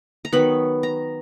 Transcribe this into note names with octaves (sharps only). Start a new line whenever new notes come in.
A#5
D#3 F#3 B3 B5
A#5